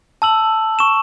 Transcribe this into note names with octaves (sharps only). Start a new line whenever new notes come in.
A5 E6 F#7
C#6 E7